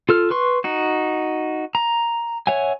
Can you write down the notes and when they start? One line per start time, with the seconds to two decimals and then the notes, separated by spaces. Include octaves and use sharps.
0.09 F4 A4 F6
0.31 B4 C6 C#6
0.64 D#4 F#4
1.75 A#5
2.47 C#5 E5 F#5 G#5